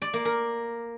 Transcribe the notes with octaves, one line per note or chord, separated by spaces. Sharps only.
D5
A#3
A#4